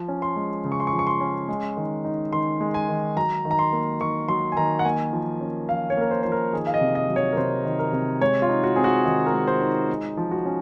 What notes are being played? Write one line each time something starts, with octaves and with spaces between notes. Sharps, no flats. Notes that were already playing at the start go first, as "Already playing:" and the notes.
Already playing: F3
C#4
C6
G#3
C#3
C#6
C6
C#6
F3
C#6
C6
C#4
G#3
D#3
D#4
D#3 C6
G#3
G#5
D#3
F#3 A#5
D#3
A#5
C6
A#3
D#3 C#6
F#3 C6
G#5
D#3 A#5
F#5
A#3 G#5
F3
C#4
F3 F5
C#5
A#3 A#4
C5
F3 C5
A#4
D#3 G#4
F5
D#5
C3
D#5
F#3
C#5
A#4
C3 C5
D#3
A#4
C3
G#3 C#5
F4
D#4
F#4
C4 G#4
F#4
D#3 G#4
A#4
G#3
C5
D#4
G#3
F3
F#4
C#4